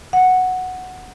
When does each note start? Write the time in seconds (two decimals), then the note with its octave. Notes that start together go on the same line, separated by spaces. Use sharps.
0.13 F#5